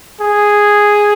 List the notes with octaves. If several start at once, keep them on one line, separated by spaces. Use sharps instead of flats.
G#4